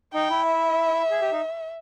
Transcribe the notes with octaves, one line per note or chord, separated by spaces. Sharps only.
D#4 G5
E4
E5
G#4
G4
D#4